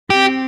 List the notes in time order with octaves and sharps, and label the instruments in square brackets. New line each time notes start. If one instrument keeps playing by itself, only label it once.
[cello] C4 [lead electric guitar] G4